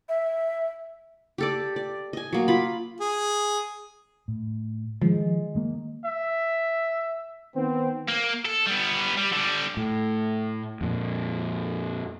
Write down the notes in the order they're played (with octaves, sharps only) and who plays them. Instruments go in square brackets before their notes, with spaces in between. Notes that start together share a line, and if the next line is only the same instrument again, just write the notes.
[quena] E5
[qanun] G4 A4 D5
D5
D#5 G#5
F#3 A#3
F4 B5
[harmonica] G#4
[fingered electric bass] A2
[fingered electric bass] D#3 [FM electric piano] F3 [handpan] G#3
[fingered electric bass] D#3 G#3 A#3
[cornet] E5
[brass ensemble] D#3 B3 C4
[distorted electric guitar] A#3
A4
G3 B3
G3
D3 G3
[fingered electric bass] A2
F2 A#2